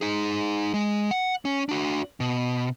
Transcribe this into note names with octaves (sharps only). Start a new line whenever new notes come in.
D#4 G#4
G#3
F#5
C#4
D4 F#4
B2